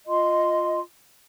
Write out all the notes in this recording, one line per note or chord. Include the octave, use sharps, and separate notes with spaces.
F4 D#5 C6